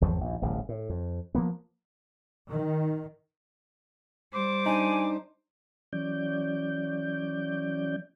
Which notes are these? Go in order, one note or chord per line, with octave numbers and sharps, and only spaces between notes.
G#1 E2 F3 F#3
A#1 D#2
D1 A1 G2
A2
F2
F3 A#3 B3
D#3
G3 C5 D6
D4 D#4 G#5
E3 F#3 C#4 D5 G6